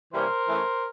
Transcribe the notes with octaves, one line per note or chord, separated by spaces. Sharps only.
C3 E3 G3 A#3 C#4 A#4 C5
E3 A3 C#4